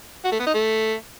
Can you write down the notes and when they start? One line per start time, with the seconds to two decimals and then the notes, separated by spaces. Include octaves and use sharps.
0.25 F#4
0.32 A3
0.40 B3
0.47 D#4
0.54 A3